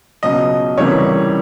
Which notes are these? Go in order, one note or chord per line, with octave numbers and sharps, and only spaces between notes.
C#2 B2 F#3 D#5
C#2 C3 E3 G3 A#3 C#5